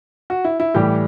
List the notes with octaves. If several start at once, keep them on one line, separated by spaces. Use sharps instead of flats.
F#4
E4
E4
A2 E3 G3 G4